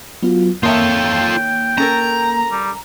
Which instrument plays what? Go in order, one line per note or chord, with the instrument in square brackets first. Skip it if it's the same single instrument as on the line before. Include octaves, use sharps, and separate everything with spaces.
[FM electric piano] F#3 B3 F4
[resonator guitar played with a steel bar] D#3 C#5 E5 [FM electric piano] A#3 [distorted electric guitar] F4 A4 [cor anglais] G5
[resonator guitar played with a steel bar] C#4 A4 A#4 [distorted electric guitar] A#5
[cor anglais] G3